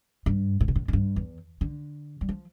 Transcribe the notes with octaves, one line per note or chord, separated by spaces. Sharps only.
G2
A2
B2
A2
A2
G2
E2
D3
G3
F3